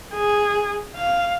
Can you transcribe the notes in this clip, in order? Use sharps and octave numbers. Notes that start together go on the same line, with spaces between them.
G#4
F5